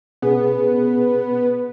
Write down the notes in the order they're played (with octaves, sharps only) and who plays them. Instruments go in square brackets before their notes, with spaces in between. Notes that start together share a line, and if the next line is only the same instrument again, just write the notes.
[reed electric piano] B2 C#4 G#4 [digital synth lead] B3